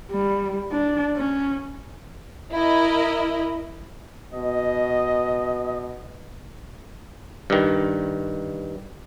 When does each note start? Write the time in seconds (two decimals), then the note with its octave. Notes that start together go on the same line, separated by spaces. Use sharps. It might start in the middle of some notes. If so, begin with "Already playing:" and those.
0.11 G3
0.72 D4
1.16 C#4
2.53 E4 A#4 D#5
4.34 B2 D#5
7.50 G2 D#3